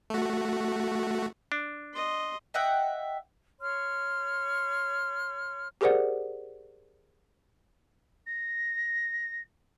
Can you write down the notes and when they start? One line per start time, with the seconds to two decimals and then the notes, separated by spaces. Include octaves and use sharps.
0.10 A3 F#4
1.52 D4
1.94 D#5 C6
2.54 D#5 E5 F#5 G5
3.60 C#5 C6 F6
5.81 G4 G#4 A#4 C5 D5 F#5
8.27 A#6